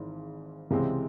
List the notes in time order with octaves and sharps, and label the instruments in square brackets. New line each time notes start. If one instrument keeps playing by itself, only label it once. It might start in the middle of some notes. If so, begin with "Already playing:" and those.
Already playing: [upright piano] G#1 G#2 E3
C#2 C3 E3 G#3 C4